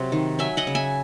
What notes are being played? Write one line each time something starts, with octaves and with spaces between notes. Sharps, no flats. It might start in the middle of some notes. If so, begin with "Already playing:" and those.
Already playing: C3 F#3
D#3
F#3 E5 G#5
D#5 F#5
C#3
E5 G#5